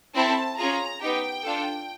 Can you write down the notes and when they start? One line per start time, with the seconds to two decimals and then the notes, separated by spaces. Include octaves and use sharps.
0.14 C4 E4 A4 A5
0.57 C#4 F4 G#4 A#5
1.01 B3 D#4 G4 G5
1.43 D4 F4 A4